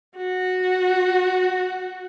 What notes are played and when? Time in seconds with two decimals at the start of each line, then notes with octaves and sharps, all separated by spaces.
0.17 F#4